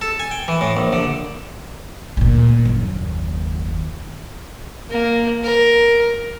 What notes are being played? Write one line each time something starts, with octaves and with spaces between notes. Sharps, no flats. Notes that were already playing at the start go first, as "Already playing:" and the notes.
A4
G#5
G5
E3
A2
A#1
D3
D2 A#2
F#1 D#2
A#3
A#4